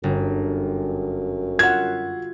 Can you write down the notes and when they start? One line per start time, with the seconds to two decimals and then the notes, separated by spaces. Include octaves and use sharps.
0.04 G1 F#2
1.59 F4 F#4 E5 F#5 G#6